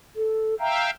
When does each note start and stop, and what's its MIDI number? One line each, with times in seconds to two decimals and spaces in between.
0.16 0.55 69
0.59 0.90 76
0.59 0.90 77
0.59 0.90 79
0.59 0.85 82